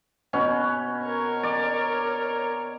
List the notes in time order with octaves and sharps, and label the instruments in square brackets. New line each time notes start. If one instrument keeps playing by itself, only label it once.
[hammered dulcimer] B2 C#4
[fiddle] A#4 C#5
[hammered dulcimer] D5